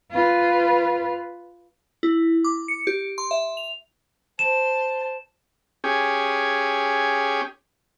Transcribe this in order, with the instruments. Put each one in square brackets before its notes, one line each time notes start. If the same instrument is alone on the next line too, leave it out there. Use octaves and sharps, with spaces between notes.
[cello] F4 B4
[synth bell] E4
D6
C#7
G4
C6
E5
F7
[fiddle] C5 A5 [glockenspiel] E7
[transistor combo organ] C#4 G4 G#4